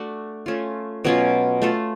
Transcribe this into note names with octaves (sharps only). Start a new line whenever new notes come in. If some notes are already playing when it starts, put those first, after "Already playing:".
Already playing: A3 D4 F#4
A3 C#4 F4
B2 F#3 C#4 F4
A3 F4 A4